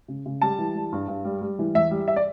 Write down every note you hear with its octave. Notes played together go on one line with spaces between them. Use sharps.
C#3
C#3
G3 A5
E3
G3
G2
G2
G3
G3
E3
E2 E5
G3
E5
D5